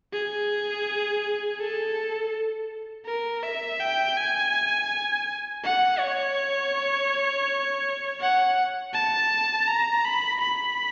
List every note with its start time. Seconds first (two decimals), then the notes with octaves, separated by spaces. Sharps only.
0.13 G#4
1.59 A4
3.06 A#4
3.43 E5
3.80 G5
4.17 G#5
5.64 F#5
6.00 C#5
8.20 F#5
8.94 A5
9.67 A#5
10.04 B5
10.41 B5